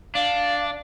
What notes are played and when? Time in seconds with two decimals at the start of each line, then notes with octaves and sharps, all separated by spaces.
0.15 D4 F5